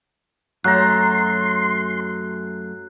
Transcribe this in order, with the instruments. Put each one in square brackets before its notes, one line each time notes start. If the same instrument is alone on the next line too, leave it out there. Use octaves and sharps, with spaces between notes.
[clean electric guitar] F#2 A3 [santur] F#3 A#5 [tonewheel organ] C6 [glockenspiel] F#6